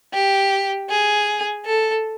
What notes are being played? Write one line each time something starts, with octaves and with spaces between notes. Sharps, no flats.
G4
G#4
A4